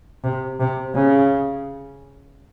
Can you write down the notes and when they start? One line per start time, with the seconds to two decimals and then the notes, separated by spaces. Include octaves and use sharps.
0.24 C3
0.60 C3
0.95 C#3